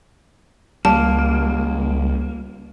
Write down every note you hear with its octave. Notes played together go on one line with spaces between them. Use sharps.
C#2 G3 A#3 A5